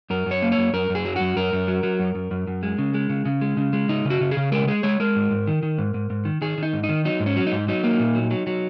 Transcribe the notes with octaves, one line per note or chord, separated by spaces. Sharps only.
F#2 A#4
F#2 C#5
A#3
C#5
F#2
F#2 A#4
F#2
G#4
F#3
F#2 F#4
F#2 A#4
F#2
F#3
F#3
F#2
F#2
F#2
F#2
G#3
C#3
G#3
C#3
C#3
G#3
C#3
G#3
C#3 D#4
C#3
F#4
C#3
G#4
C#3
G#3 A#4
G#3 G#4
G#3 C#5
G#3 A#4
G#2
G#2
D#3
D#3
G#2
G#2
G#2
D#3
D#3 G#4
D#3 D#4
G#2
D#4
D#3
F#3 D#4
G#2
C#4
F#3
D#4
G#2
F#3 D#4
A#3
A#2
F#3
F#3
F#3